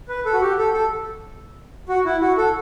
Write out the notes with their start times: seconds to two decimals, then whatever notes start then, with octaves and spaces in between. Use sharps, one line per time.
0.09 B4
0.25 A4
0.34 F#4
0.41 G4
0.58 A4
0.74 A4
1.89 F#4
2.05 E4
2.21 F#4
2.38 A4